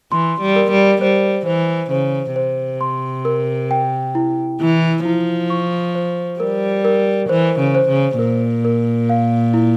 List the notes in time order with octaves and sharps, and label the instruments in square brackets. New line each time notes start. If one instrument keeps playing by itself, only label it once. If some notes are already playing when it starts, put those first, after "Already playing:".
[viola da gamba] E3 [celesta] C6
[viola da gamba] G3
[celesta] A#4
[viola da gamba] G3
[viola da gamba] G3 [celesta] C5
[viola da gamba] E3 [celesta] C5
[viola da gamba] C#3 [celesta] C5
[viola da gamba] C3 [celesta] C5
[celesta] C6
A#4
G5
E4
[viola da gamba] E3 [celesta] E4
[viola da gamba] F3 [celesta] E4
[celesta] C#6
C5
[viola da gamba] G3 [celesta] A#4
[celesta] A#4
[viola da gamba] E3 [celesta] C5
[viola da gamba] C#3
[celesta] C5
[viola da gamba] C#3
[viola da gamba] A#2 [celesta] A#4
[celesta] A#4
F5
E4